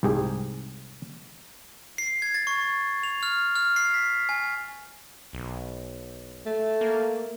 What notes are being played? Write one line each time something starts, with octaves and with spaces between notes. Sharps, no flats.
C2 G#2 G4 G#4
C7
G#6
A6
C#6
F7
F6
F6
C7
B6
G#5
B1
A3
A#3